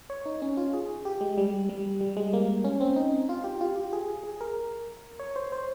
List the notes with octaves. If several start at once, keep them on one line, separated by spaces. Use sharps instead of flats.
C#5
D#4
C#4
F4
G#4
G4
G#3
G3
G3
G3
G#3
A#3
C#4
C4
D#4
F4
G4
F4
G4
G#4
G#4
A#4
C#5
C5
C5